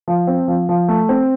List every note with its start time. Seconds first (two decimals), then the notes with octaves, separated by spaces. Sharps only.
0.08 F3
0.27 C4
0.48 F3
0.69 F3
0.88 A3
1.09 C4